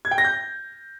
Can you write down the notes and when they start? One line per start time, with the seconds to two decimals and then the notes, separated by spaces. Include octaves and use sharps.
0.05 G#6
0.11 G5
0.18 A#6
0.25 G6